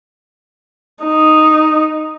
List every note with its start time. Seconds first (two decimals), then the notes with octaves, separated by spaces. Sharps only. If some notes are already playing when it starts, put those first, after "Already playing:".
1.03 D#4